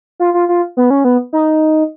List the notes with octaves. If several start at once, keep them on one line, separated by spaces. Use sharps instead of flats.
F4
F4
F4
B3
C#4
B3
D#4